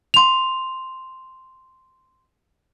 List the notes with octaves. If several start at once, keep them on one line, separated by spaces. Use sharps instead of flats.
C6 F7